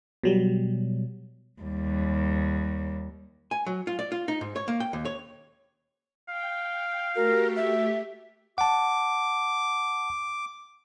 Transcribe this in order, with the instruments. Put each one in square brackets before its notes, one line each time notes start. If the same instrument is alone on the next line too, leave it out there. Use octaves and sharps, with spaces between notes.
[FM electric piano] B2 F#3 G3
[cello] D#2 G3
[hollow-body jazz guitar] G#5
F#3
F4
D5
F4
D#4
G#2
C#5
A#3
G5
D#2
C#5
[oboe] F5 [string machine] G5
[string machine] A3 G4 [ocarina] F#4 [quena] A#4
[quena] E5
[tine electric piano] F#5 A5 [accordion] D6